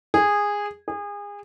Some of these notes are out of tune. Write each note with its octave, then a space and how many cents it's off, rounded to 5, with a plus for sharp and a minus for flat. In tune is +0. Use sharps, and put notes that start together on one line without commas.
G#4 -15
G#4 -30